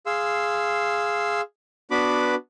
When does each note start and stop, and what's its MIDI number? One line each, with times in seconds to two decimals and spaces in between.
0.06 1.41 68
0.06 1.41 77
0.06 1.41 84
0.06 1.41 88
1.91 2.35 59
1.91 2.35 62
1.91 2.35 66
1.91 2.35 71
1.91 2.35 83
1.91 2.35 86